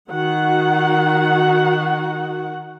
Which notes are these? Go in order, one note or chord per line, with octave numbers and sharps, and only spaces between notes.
D#3 F#4 F#5